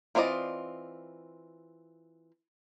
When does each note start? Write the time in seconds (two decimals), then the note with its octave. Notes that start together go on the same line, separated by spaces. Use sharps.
0.15 E3 C4 F4 D5 D#5